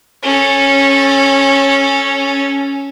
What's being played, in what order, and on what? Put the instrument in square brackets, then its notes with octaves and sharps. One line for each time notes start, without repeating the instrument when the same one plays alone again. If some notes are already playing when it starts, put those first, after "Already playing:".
[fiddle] C#4 A4